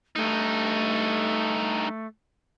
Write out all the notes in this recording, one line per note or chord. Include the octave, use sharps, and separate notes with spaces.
G2 A3 D#4